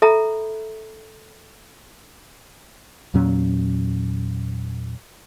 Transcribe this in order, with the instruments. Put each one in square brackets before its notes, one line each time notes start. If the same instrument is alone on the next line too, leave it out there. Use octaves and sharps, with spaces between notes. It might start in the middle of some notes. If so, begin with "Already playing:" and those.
[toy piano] A4 E5 A#5 B5
[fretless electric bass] E2 A#2 F#3 C#4